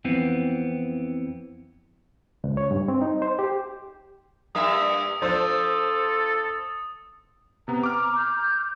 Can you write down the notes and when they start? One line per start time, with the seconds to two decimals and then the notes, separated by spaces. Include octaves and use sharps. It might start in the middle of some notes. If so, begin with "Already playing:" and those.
0.05 F2 E3 B3 C4
2.44 C#2
2.57 C#5
2.71 G2
2.88 C4
3.01 D#4
3.22 C5
3.39 G4
4.55 G2 A#3 E5 D#6
5.22 F3 D4 A4 C5
7.68 C3 B3 A#5
7.83 D6 F6
8.16 G6